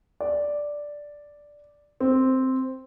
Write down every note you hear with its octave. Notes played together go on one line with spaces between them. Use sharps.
D5
C4